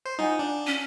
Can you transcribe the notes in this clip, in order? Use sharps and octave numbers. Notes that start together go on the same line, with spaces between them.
C5
D#4 F4 F#5 G#5
D4
C#4